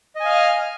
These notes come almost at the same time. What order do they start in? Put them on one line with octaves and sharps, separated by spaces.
D#5 G#5 F5 F6